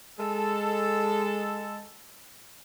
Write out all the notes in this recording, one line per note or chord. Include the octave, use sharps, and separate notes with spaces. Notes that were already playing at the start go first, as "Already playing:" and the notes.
G#3 A4